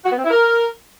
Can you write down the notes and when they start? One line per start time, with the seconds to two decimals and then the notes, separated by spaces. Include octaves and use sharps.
0.05 F#4
0.11 B3
0.18 C4
0.24 E4
0.30 A#4